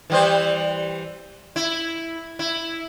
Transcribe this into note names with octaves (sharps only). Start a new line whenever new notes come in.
E3 G3 C5
E4
E4